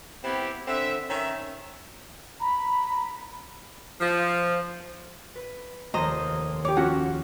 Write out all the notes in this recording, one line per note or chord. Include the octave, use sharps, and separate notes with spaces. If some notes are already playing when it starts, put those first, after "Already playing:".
B3 C4 E4 G4
D3 C4 E5
D#3 C#4 E5
A#5 B5
F3
B4
F1 D#2 C5 D#5 A#5
G4 C#5 D6
F3 C#4 F#4 F#5